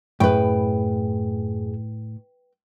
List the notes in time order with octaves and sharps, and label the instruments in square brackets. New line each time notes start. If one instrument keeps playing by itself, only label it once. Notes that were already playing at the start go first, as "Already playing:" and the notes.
[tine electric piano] F#2 G#4 [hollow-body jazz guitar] A2 [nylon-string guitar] B4 G5